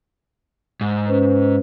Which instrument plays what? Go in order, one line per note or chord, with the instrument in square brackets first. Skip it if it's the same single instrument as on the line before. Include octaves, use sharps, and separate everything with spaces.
[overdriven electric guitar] G#2
[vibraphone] C#4 B4 C5